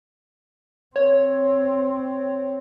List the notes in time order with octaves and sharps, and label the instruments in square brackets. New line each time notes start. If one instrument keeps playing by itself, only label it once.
[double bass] C4 [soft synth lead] C#5